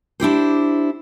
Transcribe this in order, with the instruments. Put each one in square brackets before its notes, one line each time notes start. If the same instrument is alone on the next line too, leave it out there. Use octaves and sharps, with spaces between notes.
[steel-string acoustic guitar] D4 E4 G4 C5